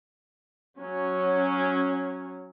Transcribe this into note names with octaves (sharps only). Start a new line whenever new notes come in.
F#3 C#4